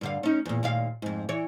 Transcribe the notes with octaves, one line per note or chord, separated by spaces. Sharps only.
G2 D3 F5
C#4 D#4
E2 A#2
D#2 A#2 F5
F2 G#2
E3 C#5